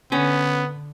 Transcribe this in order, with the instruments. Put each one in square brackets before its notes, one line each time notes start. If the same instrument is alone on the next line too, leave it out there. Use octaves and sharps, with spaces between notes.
[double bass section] D3 [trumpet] B3 [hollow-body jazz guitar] C#4